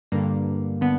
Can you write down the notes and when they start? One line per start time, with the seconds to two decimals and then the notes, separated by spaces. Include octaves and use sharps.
0.12 G2 D3 A#3
0.81 D3 B3